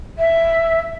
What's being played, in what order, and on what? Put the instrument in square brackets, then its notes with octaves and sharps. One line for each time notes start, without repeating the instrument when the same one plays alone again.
[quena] E5